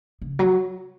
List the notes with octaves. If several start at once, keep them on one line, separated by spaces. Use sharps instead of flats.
C#3
F#3